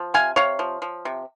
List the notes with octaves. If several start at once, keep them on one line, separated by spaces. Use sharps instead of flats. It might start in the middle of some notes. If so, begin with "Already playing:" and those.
Already playing: F3
C3 F5 G#5
C3 C#5 F5
F3
F3
C3